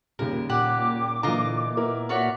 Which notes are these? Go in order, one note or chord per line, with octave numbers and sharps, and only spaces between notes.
D#2 A#2 C#3 G3 A#4
A#2 G4 F#5 D6
D3 E3 F4 D#5 A#5
B3 E4 A#4
F#4 C#5 D5 E5